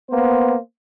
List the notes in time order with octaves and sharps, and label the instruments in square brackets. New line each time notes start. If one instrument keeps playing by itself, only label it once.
[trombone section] A#3 C5 [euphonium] B3